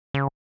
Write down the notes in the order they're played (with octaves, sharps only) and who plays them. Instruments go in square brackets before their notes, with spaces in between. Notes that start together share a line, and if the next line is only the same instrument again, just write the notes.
[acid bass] C#3